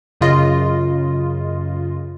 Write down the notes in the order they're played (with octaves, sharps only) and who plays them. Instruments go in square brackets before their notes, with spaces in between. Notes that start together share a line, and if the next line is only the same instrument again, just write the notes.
[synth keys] F#2 C#3 F4 D#5